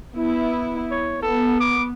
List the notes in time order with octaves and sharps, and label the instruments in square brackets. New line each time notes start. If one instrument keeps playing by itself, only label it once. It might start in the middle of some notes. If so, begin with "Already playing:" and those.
[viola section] B3 E4
[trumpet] C#5
[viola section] B3 [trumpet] A4
[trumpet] D6